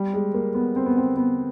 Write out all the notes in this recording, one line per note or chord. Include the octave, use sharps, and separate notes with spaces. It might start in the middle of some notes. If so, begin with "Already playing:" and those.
Already playing: G3
G#3
A#3
B3
C4
B3
C4
B3